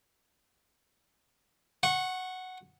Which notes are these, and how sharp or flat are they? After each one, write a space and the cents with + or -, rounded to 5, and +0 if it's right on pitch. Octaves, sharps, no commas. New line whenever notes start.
F#5 +0 C#6 -25